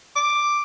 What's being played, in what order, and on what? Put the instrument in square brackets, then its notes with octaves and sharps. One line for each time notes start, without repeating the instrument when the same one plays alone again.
[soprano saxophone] D6